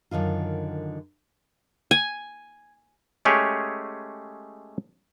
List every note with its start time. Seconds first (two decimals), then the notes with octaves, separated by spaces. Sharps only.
0.11 F#2 D3 D#3 F4
1.91 G#5
3.25 G#3 A3 C#4 G4 G#4 C#5